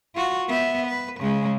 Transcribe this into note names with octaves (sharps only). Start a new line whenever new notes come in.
F4 F#4
B3 E5
B4
C#3 G#3